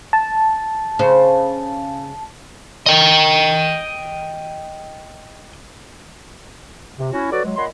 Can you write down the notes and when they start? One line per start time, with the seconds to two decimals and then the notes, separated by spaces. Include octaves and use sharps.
0.13 A5
0.99 C#3 C5
2.86 D#5 G5
6.98 C3
7.13 C#4 E4 F#4
7.31 F#3 F#4 A4 B4 D5
7.45 F#3 G#3
7.57 A#2 C#5 D#5 F#5 B5 C6